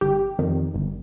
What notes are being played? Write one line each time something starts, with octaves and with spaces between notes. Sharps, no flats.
G1 G4
F2 D#3
G1